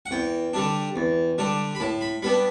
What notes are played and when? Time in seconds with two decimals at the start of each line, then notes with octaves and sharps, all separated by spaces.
0.06 F#5
0.11 E2 G5
0.53 D3 G3 D4
0.96 E2
1.38 D3 G3 D4
1.75 B5
1.80 A2 A5
2.01 B5
2.22 G3 B3 D4 B5